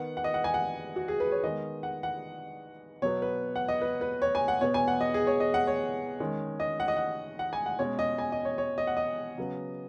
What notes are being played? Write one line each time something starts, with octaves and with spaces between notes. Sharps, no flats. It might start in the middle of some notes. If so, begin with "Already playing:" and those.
Already playing: D#3 B3 F#5
F#5
D#5
F#5
G#5
F#5
F#4
G#4
B4
C#5
D#3 G#3 B3 D#5
F#5
F#5
B2 F#3 B3 C#5
B4
F#5
D#5
B4
B4
C#5
G#5
F#5
B2 B3 C#5
G#5
F#5
D#5
G#4
C#5
D#5
F#5
C#5
D#3 G#3 C#4
D#5
F#5
D#5
F#5
F#5
G#5
F#5
B2 G#3 C#4 C#5
D#5
G#5
D#5
C#5
C#5
D#5
F#5
D#5
C#3 F#3 B3